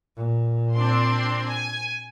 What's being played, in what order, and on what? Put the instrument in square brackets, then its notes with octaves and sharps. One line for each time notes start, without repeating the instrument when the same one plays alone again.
[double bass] A#2
[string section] C4 D4 C6
G#5